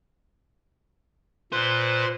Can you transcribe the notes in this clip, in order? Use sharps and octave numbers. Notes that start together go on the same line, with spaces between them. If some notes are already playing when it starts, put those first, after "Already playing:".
A#2 B4 C5